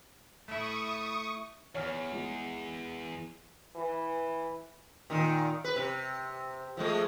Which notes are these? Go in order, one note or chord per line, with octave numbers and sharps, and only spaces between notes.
A3 E4 E5 C#6 D#6
E2 C#5 G#5 F6
G#3
E3
A#2 D#3
B4
C3
F3 G#3 A3